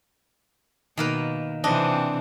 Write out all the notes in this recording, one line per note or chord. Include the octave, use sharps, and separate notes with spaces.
B2 D#3 A#3 B4
C3 E3 C4 D4 D#5